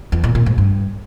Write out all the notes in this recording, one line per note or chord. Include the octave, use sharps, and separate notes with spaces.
E2
A#2
A#2
G#2
G2